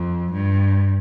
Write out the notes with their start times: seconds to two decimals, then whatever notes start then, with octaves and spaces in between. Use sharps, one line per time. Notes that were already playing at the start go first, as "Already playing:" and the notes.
Already playing: F2
0.33 G2